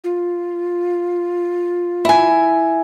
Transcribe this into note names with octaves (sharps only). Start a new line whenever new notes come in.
F4
E4 G#5